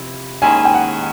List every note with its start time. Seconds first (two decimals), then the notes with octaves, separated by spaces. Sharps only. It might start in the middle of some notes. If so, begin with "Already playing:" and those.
Already playing: C3 F3 E4
0.42 D#2 D#3 G#3 C#4 E4 G#5
0.65 G5
0.74 F#5